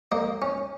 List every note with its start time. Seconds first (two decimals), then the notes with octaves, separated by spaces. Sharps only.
0.12 A#3 D#5
0.42 C#4